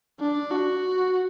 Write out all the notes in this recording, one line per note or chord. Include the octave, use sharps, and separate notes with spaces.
D4
F#4